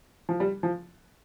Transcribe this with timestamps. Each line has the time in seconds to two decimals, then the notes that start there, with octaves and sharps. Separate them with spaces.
0.29 F3
0.40 G3
0.63 F3